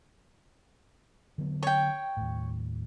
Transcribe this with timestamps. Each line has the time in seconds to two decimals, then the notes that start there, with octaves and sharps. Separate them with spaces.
1.38 D3 F#3 B3
1.63 C#5 G5
2.17 D#2 A2